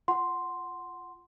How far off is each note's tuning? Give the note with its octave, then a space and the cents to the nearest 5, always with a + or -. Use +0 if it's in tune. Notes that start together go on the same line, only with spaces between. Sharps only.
F4 -15 F#5 +0 C6 +0